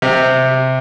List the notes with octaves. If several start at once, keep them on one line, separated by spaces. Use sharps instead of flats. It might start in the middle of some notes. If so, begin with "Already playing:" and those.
C3